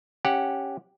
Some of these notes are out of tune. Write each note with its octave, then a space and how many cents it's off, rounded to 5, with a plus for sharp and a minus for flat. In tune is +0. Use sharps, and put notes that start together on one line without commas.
C#4 +0 G4 +0 F#5 -5